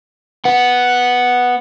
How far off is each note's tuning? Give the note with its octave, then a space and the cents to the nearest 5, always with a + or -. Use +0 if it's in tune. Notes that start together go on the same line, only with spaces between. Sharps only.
B3 +0 F#5 +0